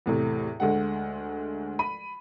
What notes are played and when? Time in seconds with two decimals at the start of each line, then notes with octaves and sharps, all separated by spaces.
0.06 E2 A2 C3
0.60 D2 G#3 A3 F#5
1.79 B5 D#7